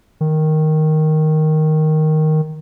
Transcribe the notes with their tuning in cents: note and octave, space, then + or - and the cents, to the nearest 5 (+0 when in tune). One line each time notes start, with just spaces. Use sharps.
D#3 +0